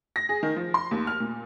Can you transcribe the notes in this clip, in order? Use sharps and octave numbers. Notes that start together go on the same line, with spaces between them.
A#6
G#4
D#3
F3
C6
D#2
F6
A#2